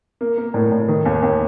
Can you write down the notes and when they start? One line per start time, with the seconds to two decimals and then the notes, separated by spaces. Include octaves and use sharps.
0.21 A#3
0.38 A#3
0.54 A2
0.72 A2
0.88 D#3
1.05 D#2
1.23 D#2